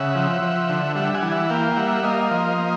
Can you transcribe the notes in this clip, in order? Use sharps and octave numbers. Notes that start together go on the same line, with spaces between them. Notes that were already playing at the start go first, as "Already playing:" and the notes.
Already playing: C#3 E5 F#5
F3
F3
D3
G3 E5 F#5
F#5 G#5
E3
E5 F#5
A#3 F5 G5
G3 E5 F#5
A#3 D#5 F5
F3
A#3